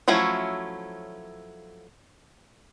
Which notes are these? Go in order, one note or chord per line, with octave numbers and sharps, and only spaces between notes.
F3 F#3 A3 C#4 E4